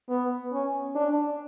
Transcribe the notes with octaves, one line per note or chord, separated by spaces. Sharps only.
B3
C#4
D4